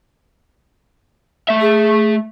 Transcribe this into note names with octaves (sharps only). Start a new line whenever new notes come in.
A3 E5
G#4